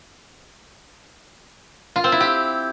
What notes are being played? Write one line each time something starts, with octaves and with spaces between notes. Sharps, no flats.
F4
C4
E4
G4